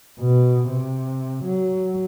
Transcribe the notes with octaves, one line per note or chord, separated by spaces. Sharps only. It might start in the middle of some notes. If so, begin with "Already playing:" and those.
B2
C3
F#3